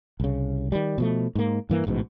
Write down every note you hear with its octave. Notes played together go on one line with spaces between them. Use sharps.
C2 C#3
D#3 G3
B2 F3 A3
G#2 A#3
G2 E3 A#3
A1 G#2 B2